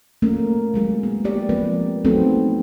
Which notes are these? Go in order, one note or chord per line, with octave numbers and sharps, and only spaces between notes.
A3 A#3 C#4
F#3 G#3 G#4
B3
A#3 G4 D5
F3 G#3 A#3 C4 B4
F#3 A3 B3 C4 D#4 A4